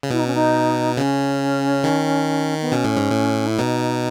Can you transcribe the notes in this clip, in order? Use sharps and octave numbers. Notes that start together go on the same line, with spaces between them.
C#3
B2 E4
D#4
C#4
D#4
C#3 C#4
D#3
B3
B2 C#4
A2
G#2
A2
E4
B2 D#4